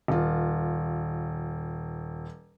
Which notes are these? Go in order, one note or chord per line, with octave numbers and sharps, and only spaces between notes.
D#1 F4